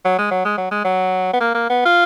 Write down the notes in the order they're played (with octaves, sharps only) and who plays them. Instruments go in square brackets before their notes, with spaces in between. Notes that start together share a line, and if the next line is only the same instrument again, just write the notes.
[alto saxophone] F#3
G#3
F#3
G#3
F#3
G#3
F#3
B3
A#3
A#3
B3
F4